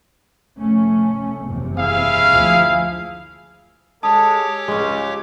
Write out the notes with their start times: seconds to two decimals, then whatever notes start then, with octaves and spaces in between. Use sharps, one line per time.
0.60 F1 A3 C#4
1.46 F#1 E2 C3
1.77 E4 G#4 F5
2.31 D2 F3
4.03 G#3 G4 A4 C#5 A5 D6 D#6
4.68 C#2 G#3 C#4 G#5